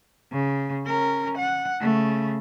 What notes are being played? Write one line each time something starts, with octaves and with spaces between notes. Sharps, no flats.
C#3
C#4 A#4
F#5
C#3 A3